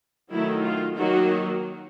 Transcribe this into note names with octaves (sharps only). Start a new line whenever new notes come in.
D#3 F#3 A3 E4
F4
D#3 F#3 A#3 F#4